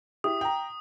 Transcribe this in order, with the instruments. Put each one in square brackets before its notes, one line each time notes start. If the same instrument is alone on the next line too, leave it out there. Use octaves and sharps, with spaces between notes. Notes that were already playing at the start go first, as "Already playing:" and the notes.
[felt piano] E4 G4 [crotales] D#6
[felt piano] G5 A#5